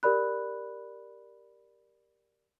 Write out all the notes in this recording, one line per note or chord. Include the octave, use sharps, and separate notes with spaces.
G4 A#4 D5 B5 F#6